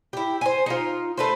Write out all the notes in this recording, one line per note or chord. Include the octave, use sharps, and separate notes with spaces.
E4 G4
C5 G#5
D#4 F4
A3 B4 C5